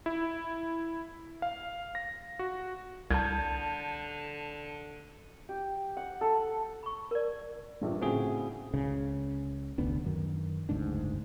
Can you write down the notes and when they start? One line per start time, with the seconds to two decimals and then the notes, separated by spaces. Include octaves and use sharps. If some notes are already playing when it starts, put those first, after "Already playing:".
0.06 E4
1.42 F5
1.95 A#6
2.39 F#4
3.11 C2 D3 A5 G6 G#6
5.49 G4
5.97 F#5
6.21 A4
6.83 B5 C#6
7.11 A#4 D5
7.81 A#1 G2
8.02 A2 C#3 C4 F#4 G#4
8.74 C#2 C#3
9.78 F1 D2 B3 D4
10.06 F#2 D#3
10.69 F#1 D2 G#2 D4